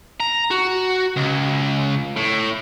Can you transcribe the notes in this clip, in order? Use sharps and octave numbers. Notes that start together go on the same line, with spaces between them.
A#5
F#4
C#2
A2